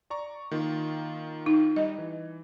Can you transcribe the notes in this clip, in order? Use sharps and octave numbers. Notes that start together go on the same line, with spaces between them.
D5 A#5 C#6
D#3 A#3 F4
D#4
G3 D#4 D#5
E3